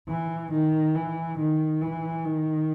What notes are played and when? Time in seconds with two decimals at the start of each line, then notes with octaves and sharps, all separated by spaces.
0.08 E3
0.52 D#3
0.95 E3
1.38 D#3
1.81 E3
2.25 D#3